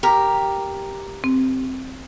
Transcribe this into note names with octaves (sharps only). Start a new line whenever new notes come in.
G4 A#4
C4